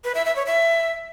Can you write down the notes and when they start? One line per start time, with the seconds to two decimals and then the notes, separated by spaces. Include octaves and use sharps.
0.04 B4
0.15 E5
0.25 E5
0.36 C#5
0.46 E5